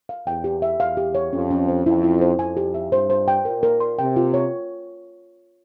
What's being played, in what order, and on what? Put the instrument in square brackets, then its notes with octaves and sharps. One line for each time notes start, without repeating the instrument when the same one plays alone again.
[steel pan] F5
[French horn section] E2 [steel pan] G5
[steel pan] G4
E5
[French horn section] E2 [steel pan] F5
[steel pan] G4
C#5
[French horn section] F2 [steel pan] C#4
[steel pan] C#4
C5
[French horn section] F2 [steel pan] E4
[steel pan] E4
C5
[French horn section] F2 [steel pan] G#5
[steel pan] G4
E5
[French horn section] G2 [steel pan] C5
[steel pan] C5
G5
[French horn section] A#2 [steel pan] A#4
[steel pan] A#4
C6
[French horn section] C3 [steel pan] G5
[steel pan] F4
C#5